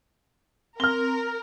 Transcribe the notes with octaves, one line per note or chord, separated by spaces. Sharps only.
C4 A#4 F6 G7